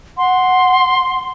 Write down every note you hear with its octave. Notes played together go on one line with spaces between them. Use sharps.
F#5 C6